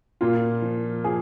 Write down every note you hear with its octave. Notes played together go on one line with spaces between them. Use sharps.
A#2 F4
F3
F3 G#4